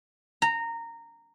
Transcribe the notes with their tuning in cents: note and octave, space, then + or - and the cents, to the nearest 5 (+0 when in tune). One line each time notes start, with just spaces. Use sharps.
A#5 -15